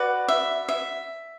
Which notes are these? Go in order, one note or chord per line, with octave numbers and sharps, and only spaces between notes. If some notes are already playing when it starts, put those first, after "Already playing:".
Already playing: F#4 B4 D5
E5
E5